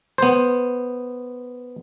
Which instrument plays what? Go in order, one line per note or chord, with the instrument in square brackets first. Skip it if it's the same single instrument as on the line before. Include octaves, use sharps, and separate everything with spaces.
[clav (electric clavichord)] B3 C5